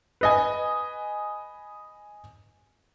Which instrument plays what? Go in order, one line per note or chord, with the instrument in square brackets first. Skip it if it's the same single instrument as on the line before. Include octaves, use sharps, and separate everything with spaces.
[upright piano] B4 D#5 G#5